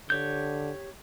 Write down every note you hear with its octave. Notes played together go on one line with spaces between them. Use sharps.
D3 G4 C#5 G6